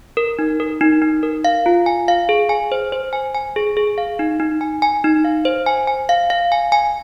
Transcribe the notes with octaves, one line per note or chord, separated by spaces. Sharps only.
A#4
D#4
A#4
D#4
D#4
A#4
F5
F4
G#5
F5
G#4
G#5
C5
C5
G#5
G#5
G#4
G#4
F5
D#4
D#4
G#5
G#5
D#4
F5
C5
G#5
G#5
F5
F5
G#5
G#5